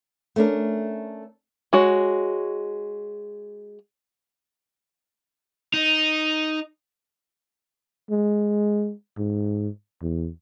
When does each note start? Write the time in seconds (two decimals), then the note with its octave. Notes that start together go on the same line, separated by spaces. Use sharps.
0.36 A3 C#4 D4 A#4
1.73 G#3 F#4 C#5
5.74 D#4
8.10 G#3
9.18 G#2
10.02 E2